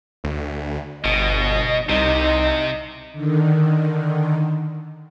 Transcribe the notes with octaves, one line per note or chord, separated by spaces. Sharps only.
D2
G1 B2 D#5
C2 C3 D#4
D3 D#3